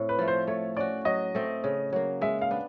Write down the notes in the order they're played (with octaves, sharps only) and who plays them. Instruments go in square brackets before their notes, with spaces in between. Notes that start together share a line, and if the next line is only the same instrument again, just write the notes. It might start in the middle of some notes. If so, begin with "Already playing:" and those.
Already playing: [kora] A2 C4
[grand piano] B4
[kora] F3 A3
[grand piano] C5
[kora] A3 [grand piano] C#5
[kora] C#4 F#4 [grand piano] D5
[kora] F#3 [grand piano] D#5
[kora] A3 C4
C#3
F#3 A#3
[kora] G#3 [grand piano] E5
[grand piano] F5
[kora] B3 D4